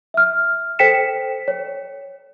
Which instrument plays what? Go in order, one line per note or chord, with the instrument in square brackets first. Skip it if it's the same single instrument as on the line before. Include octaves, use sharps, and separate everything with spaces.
[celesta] E5 F6
A4 C5 G5 B6 C#7 E7
C#5